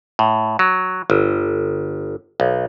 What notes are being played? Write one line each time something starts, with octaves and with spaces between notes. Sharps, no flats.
A2
F#3
G1
B1